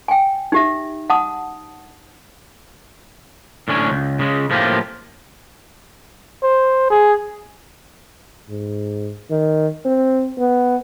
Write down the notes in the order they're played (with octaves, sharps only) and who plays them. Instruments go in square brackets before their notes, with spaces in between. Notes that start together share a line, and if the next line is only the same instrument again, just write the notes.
[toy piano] G5 G#5
D#4 G4 E5
F#5 A5 D#6
[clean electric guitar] A2 D3 C#4 D4 C#5
C#2
C#3 G#3
A2 F3 A3 A#3 F4 G4
[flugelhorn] C5
G#4
[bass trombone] G#2
D#3
C4
B3